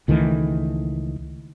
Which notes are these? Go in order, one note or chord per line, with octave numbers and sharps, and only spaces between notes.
C#2 D#3 E3 A3